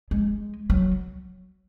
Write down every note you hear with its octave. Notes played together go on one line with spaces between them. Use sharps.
G#3
F#3